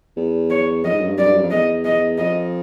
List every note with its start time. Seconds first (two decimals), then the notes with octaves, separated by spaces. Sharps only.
0.17 E2
0.50 C#5
0.84 F2 D#5
0.92 G#2
1.01 F#2
1.09 G2
1.18 F#2 D5
1.27 G2
1.35 F#2
1.43 F2
1.51 E2 D#5
1.85 D#5
2.18 F2 D#5